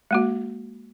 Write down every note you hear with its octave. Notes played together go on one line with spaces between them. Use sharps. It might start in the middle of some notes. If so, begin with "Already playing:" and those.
G#3 A#3 F#4